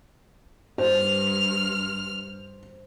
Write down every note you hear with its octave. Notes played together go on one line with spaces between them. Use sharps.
G2 C5 F6